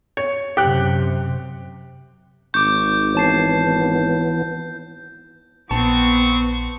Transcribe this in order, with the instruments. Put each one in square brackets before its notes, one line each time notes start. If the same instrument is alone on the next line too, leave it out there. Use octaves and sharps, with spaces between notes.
[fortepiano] C#5
[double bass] F#2 C3 [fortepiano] G4 F#6
[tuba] G#1 [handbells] C#6 D6 [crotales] G6
[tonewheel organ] E3 B3 [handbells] C#5 A5 C7
[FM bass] A#1 [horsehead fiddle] B3 [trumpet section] C4 C#6 [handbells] A5